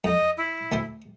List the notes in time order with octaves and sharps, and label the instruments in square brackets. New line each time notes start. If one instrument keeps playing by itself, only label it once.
[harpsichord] F2 [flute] D#5
[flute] E4
[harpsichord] D2 A3 C5